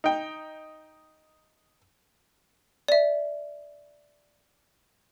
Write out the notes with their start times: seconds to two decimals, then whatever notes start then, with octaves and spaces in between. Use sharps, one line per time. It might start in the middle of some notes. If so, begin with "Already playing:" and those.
0.04 D#4 G5
2.88 D5 E5